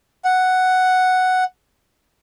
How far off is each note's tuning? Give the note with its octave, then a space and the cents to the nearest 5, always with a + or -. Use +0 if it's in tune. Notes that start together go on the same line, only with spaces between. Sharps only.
F#5 +0